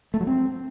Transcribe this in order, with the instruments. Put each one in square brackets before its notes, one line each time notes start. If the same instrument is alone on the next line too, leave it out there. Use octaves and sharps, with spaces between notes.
[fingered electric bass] A3
F#3
C4